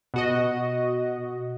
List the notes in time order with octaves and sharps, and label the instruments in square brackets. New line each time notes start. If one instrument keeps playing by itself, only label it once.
[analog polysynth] B2 F#4 D#5